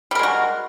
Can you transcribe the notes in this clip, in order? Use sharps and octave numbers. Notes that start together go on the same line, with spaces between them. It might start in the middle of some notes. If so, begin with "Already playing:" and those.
G3 G#3 F#4 A#4